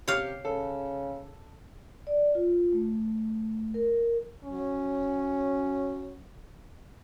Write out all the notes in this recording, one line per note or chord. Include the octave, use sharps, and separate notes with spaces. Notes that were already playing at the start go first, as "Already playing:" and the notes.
C3 G4 C#5 F5
C#3 A4
D5
F4
A3
A#4
F#3 C#4